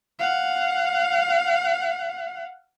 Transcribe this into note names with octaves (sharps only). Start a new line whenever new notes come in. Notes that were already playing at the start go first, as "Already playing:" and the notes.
F5 F#5